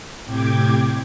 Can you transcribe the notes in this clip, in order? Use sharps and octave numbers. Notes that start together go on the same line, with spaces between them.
A2 C3 G5 D6 G#6